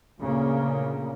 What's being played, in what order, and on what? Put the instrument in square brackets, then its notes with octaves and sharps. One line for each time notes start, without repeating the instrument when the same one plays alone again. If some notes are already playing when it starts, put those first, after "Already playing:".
[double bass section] D2 A#2 C#3 A#3